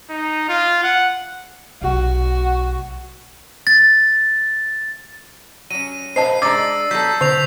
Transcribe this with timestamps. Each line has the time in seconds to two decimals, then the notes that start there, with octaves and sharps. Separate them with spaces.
0.10 D#4
0.49 F4
0.84 F#5
1.82 B1 A3 F#4
3.67 A6
5.71 F#3 C#4 D#7
6.16 A#2 E4 B4 C5 D#5 A5 C7
6.42 G#3 D4 A#5 D6 E6 A6
6.91 F#3 B3 A4 G6 B6
7.21 B2 D3 C7 F7